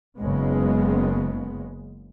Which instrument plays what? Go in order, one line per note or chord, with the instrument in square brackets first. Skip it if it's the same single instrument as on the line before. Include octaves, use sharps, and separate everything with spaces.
[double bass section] F#1 C#3 G#3 B3